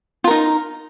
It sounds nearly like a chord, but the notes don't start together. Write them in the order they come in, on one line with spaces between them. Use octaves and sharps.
F4 A#4 D#4